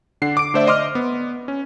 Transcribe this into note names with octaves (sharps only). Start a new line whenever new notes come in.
D3 D4 F#5 C7
D6 D7
D3 A3 C5 D5 E5
D#5 C6 D6 F6
B3
C#4